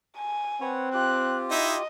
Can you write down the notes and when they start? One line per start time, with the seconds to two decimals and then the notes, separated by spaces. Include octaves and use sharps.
0.17 G#5
0.61 C4 B4 C#5 F#5
0.94 F4 G4 F#6
1.51 D#4 E4 D#5